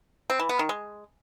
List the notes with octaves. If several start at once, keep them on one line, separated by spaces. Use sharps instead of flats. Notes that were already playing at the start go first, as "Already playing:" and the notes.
C4
E3
B3
D#3
G#3